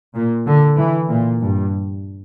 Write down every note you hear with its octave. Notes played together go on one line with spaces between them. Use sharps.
A#2
D3
E3
A#2
G2